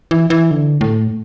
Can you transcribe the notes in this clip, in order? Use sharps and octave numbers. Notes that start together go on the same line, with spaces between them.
E3
E3
D3
A2